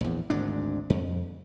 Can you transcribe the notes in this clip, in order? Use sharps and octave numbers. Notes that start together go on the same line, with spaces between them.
A#1 E2
G#1 D2 G#2 D4
F2